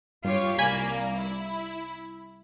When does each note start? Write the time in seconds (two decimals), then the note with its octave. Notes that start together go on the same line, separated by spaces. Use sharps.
0.24 G2 F4 G4 C#5
0.59 C2 A#3 D5 G#5 B5
1.17 E4